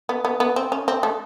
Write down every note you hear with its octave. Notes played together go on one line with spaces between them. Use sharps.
B3
B3
B3
C4
C#4
C4
A3